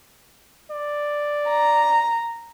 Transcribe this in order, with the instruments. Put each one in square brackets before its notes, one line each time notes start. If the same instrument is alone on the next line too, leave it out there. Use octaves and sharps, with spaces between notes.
[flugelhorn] D5
[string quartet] A#5